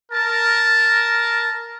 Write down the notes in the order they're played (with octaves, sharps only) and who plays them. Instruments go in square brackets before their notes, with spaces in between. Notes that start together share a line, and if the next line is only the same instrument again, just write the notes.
[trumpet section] A#4 A5